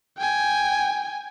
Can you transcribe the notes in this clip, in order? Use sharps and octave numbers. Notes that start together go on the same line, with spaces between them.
G5 G#5